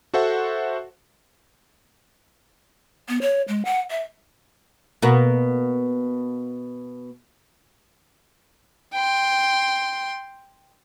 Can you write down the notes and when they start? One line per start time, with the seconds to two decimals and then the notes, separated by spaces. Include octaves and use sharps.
0.14 F#4 A4 C5 E5 F#5
3.09 B3
3.22 C#5
3.48 G#3
3.65 F#5
3.91 E5
5.02 B2 A#3 F#4
8.93 G5 C6